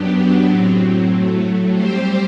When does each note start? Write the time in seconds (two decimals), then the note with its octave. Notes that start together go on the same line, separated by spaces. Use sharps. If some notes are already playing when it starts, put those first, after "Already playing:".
Already playing: F#2 F#3 B3 D4 G4
0.45 A2 F#3 C4
1.09 A2 F#3 A3
1.73 G3 C4 G4 C5